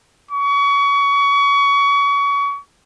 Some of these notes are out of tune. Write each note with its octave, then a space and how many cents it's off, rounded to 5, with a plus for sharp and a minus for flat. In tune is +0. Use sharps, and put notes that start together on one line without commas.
C#6 +30